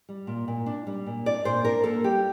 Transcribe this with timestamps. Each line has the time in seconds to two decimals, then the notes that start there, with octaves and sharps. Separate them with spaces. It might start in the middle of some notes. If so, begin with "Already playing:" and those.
0.09 G3
0.27 A#2
0.48 A#2
0.66 D4
0.87 G3
1.07 A#2
1.26 D4 D5
1.44 A#2 C5
1.65 D4 A#4
1.84 A#3 A4
2.04 G3 G4